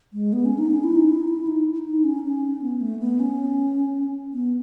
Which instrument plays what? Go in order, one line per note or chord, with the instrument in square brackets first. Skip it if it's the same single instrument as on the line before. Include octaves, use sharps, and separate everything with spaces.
[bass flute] G#3
B3
C#4
D#4
C#4
E4
D#4
E4
E4
D#4
D#4
C#4
C#4
B3
A3
B3
C#4
B3